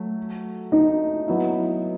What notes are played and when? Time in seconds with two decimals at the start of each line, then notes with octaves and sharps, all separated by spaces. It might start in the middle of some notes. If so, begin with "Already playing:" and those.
Already playing: F#3 A3
0.72 D#4
1.28 F#3 B3 E4